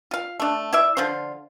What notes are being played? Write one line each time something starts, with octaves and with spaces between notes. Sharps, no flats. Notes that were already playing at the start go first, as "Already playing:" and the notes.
F4 F5
A3 D4
E4 D5 E5
D3 F3 F4 C5